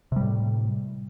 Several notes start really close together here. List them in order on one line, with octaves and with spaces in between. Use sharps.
C3 G3 A2